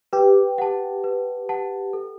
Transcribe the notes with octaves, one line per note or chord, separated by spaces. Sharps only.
G4 B4
F#5 A5
B4
F#5 A5
A4